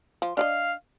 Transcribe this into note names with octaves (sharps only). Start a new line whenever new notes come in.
F3
D4 D5 D#5 F5